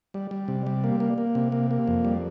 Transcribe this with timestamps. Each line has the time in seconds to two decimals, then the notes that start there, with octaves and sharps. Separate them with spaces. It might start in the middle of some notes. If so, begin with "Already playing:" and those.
0.14 G3
0.31 G3
0.48 C3
0.67 G3
0.84 A#3
1.00 A#3
1.18 A#3
1.35 C3
1.52 A#3
1.71 A#3
1.88 F2
2.05 G3